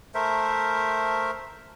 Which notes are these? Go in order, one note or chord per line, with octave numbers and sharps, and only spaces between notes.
A3 A#4 C5 E5